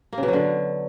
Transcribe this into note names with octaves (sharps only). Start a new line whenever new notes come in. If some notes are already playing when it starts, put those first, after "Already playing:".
A#3
C#3
B2
F#3
D3